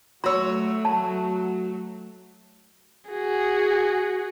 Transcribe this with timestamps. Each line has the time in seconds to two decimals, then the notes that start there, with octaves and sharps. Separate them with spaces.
0.24 F#3 A3 F#4 C#5 C6 E6
0.85 A5
3.11 F#4 G#4